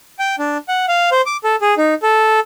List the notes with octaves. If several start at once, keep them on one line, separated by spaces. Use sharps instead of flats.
G5
D4
F#5
F5
C5
D6
A4
G#4
D#4
A4